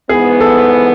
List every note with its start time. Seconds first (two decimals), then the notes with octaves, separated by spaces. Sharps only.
0.09 G#2 E3 B3 G#4
0.41 A4